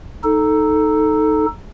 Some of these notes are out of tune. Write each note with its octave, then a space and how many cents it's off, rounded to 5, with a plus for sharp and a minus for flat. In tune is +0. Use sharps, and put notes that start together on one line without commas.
D#4 +0 A4 +0